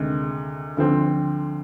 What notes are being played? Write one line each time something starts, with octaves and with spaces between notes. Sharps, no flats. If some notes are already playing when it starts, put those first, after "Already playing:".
Already playing: D2 C3 D#3 G#3
D2 D3 F3 C4